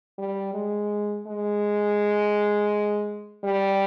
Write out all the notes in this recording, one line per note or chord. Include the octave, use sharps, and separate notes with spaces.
G3
G#3
G#3
G3